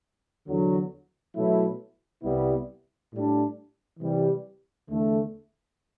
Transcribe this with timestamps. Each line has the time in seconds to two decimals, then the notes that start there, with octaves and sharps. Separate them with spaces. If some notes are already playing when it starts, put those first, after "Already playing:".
0.46 E2 D3 F#3
1.34 B2 F#3 A3 E4
2.22 C2 C3 G3 B3 E4
3.11 A2 G3 D4
3.99 C3 E3 G3
4.88 E2 D3 A3